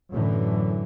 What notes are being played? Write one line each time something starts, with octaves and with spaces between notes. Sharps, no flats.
F#2 A2 D3 E3